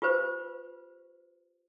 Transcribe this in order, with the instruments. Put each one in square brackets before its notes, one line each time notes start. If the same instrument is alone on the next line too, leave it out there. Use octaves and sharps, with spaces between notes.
[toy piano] F4 G4 B4 C5